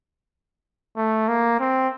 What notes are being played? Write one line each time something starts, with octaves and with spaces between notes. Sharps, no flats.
A3
A#3
C4